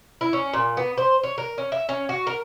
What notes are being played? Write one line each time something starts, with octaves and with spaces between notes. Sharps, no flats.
E4
C#4
A#2
B3
C5
C#5
A#4
C#4
E5
C#4
F#4
A#4